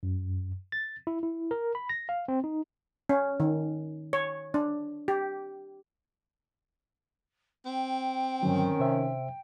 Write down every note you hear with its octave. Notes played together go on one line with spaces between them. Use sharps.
F#2
A6
E4
E4
A#4
B5
A#6
F5
C4
D#4
C#4
D#3
C#5
D4
G4
C4 G5
G2 D3 D#3 F#3 C#4
C3 C5 E5